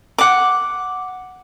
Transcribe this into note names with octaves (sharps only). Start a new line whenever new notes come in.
F#5 D6